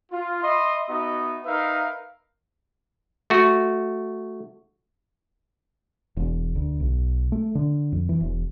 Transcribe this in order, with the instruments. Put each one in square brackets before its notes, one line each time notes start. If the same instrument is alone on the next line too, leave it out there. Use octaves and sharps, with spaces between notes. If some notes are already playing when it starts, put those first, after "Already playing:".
[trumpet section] F4
D#5 E5 B5 C6
B3 D#4 F#4 D#5 E5
D#4 A#4 B4 E5 F5
[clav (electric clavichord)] A3 F#4
[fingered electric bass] E1
D2
B1
A3
D3
F2
E3
E1